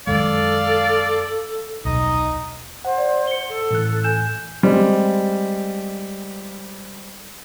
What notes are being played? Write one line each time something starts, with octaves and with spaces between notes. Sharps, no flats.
F#2 D#3 G#3 A4 D5 F5
D#1 B1 D#4 D#5
C5 F#5
D5
C#7 G7
A4
A2 E3 F#6
G#5 G6 E7
G3 G#3 C4 G4